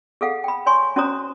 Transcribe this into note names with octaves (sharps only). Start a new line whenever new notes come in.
G#4 A4 F5 F#5
G5 B5
C#5 G#5 C6 C#6
C#4 F#4 C5 C#5 A#5 D#6